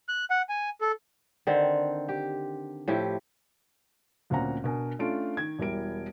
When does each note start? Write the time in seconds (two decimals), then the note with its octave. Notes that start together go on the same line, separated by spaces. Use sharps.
0.08 F#6
0.30 F#5
0.49 G#5
0.81 A4
1.47 D3 D#3 C4
2.09 G4
2.88 A2 F3 E4 G4
4.30 D2 A#2 C4 C#4 F#5 A#5
4.64 B2 D4 A#4 G#5
4.99 A3 C#4 D4 F4 D7
5.37 D#3 G#6
5.58 E1 G3 E4 A#4 D7